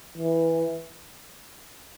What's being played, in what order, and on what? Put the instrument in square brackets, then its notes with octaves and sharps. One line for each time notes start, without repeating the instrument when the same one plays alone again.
[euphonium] E3